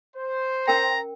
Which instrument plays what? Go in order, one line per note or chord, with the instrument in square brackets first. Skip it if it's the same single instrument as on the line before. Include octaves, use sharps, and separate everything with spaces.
[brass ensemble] C5
[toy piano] C#4 A#4 G5 [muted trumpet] A#5